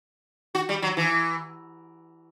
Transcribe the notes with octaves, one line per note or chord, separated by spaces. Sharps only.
F#4
G3
F#3
E3